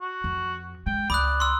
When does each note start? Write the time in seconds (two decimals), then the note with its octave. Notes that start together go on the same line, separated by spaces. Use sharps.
0.01 F#4
0.24 F2
0.87 G#3 G5
1.10 C#2 D5 B5 D#6 F#6
1.40 C6 E6